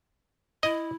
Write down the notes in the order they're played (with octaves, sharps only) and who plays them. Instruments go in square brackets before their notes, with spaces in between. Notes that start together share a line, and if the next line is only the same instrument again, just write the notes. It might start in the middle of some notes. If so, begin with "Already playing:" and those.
[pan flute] E4 [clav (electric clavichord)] D#5